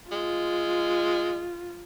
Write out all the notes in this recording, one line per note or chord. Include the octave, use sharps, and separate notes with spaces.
G#3 F4